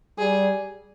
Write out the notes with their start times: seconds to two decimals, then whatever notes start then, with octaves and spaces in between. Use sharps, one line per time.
0.19 G3 G#4